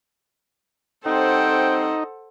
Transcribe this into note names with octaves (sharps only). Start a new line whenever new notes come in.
G3 C4 D#4 A4 C5 F#5 G5